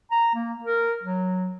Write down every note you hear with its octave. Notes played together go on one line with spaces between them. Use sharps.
A#5
A#3
A#4
F#3